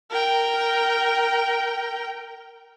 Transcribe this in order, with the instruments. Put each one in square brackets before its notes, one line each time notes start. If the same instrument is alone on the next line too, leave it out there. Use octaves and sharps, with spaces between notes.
[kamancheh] A#4 G5